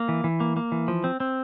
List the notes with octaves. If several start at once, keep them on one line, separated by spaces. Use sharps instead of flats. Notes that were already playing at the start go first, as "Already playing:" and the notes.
Already playing: A#3
E3
E3
A#3
A#3
E3
F3
C4
C4